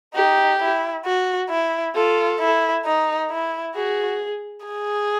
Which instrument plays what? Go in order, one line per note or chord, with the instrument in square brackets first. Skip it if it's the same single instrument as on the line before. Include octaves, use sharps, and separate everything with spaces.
[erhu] D#4 [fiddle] G4
[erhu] E4
F#4
E4
[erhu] F4 [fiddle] A4
[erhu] E4
D#4
E4
[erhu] F#4 [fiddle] G#4
[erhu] G#4